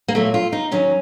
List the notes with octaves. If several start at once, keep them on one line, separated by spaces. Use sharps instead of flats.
A#3
A#2 F#3 A3
F4
D#4
D#2 D#3 F#3 C#4